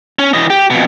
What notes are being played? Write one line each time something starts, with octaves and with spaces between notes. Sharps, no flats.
C#4
E3 D#5
G4
F2 B2